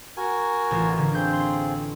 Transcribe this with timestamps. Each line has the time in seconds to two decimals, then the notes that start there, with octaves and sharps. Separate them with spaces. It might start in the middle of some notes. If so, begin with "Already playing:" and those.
0.17 F#4 A#4 G#5
0.71 A1 F4
0.98 D3 A#4
1.15 C4 F4 G#4 G6
1.33 C6